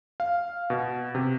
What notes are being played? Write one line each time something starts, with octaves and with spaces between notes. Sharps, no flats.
F5
B2
C3